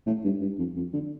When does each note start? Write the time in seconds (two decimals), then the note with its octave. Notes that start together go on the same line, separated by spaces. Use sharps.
0.06 A2
0.24 G2
0.41 G2
0.58 F2
0.76 F2
0.93 D3